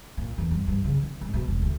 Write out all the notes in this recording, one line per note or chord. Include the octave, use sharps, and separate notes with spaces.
A#2
E2
G2
G2
C#3
D#3
G#2
B2
E1
D2